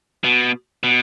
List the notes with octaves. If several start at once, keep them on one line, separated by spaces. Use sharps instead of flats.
B2
B2